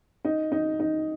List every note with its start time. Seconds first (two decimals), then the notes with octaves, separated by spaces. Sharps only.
0.25 D#4
0.52 D#4
0.80 D#4